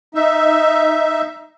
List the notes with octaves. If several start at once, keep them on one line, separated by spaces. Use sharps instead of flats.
D#4 E5